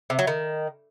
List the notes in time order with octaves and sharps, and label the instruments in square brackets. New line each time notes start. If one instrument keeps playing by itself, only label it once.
[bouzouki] C3
F#3
D#3